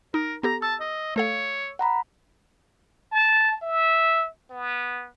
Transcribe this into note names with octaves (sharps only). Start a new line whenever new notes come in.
D#4 A#4
B3 G4 A4 A#5
A5 E6
D#5
A3 A4 C#5 F5
F#5 A#5 B5
A5
E5
B3